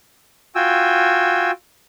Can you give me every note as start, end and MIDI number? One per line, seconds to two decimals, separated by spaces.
0.55 1.51 65
0.55 1.51 66
0.55 1.51 79
0.55 1.51 80
0.55 1.51 88